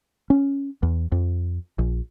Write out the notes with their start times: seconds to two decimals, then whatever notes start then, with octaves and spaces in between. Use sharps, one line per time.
0.30 C#4
0.83 E2
1.12 F2
1.79 A#1